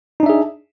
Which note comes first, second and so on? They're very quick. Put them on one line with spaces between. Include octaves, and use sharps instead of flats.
D#4 D4 E5 G#4